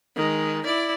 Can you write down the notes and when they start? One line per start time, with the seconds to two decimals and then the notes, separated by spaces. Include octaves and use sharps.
0.16 D#3 G#3
0.65 E4 D5